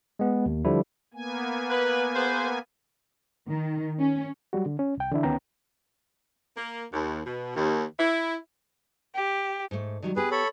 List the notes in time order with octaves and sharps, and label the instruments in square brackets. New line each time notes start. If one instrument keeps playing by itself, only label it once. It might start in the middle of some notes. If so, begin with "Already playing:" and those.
[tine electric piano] G#3 B3
D#2
D3 F3 G3 E4
[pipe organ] A#3 B3 G#5
[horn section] B4
G#4 B4 C5
[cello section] D#3
C#4
[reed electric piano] F#3 G3 F#4
D3
C#4
C2 G5
D3 E3 D4 E4
D2 D#3 B3 C#4 G5 A#5
[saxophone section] A#3
D#2
B2
D#2
E4
[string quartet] G4
[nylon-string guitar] G#2 A3
D#3 F#3 G3
[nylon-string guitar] B3 G4 [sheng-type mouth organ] G#4 B4
[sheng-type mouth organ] A4 C#5 B5